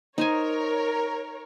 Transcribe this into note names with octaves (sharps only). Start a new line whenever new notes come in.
D#4 A#4 C5 C#5 G#5